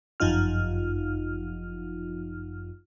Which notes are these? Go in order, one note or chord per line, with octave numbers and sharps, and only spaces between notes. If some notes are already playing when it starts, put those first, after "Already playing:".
G1 F#2 F3 D#4 F4 F6